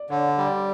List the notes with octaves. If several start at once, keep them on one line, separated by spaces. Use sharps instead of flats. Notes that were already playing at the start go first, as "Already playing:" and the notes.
Already playing: D5
D3 C#5
D5
G3
D5